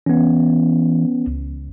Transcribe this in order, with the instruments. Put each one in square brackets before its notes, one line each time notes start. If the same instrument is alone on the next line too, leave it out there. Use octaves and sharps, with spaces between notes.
[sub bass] E3 [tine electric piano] B3 C#4
[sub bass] C#2